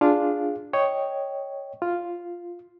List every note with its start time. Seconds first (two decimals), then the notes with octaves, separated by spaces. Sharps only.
0.01 D4 F4 G#4 F5
0.73 C#5 D#5 G5
1.82 F4